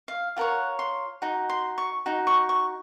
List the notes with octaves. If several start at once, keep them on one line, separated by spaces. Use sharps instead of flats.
F5
F4 A#4 C#5 F#5
C6
D#4 F#4
C6
C#6
D#4 F#4
C#6
C#6